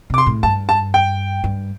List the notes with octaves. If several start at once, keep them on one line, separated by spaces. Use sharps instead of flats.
C3 D6
C6
A2
G2 A5
A5
G5
G2